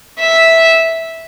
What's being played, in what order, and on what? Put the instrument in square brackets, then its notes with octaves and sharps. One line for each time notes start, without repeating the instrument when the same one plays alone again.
[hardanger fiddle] E5